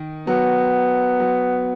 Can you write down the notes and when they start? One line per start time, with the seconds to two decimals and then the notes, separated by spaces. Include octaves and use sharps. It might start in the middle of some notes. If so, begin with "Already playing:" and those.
Already playing: D#3
0.27 F#3 B3
1.20 F#3